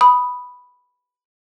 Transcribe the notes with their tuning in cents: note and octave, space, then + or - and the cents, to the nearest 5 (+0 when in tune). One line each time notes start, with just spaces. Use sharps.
B5 +0 D#6 +0